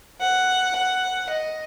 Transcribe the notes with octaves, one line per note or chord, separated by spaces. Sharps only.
F#5
F#5
D#5